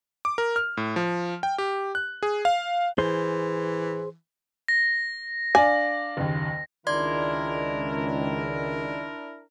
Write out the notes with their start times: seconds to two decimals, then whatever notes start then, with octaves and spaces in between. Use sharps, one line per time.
0.25 D6
0.38 A#4
0.56 F6
0.77 A2
0.96 F3
1.43 G5
1.58 G4
1.95 F#6
2.23 G#4
2.45 F5
2.98 E3 G#4 C5
4.68 A#6
5.55 D4 D5 F5 G#5
6.17 F#1 D#2
6.87 C#2 D#3 D4 E4 A#4 D5 C6 G#6